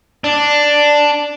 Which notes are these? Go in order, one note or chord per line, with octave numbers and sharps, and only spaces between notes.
D4